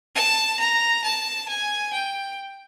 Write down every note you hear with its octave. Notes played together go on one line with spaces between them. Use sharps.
A5
A#5
A5
G#5
G5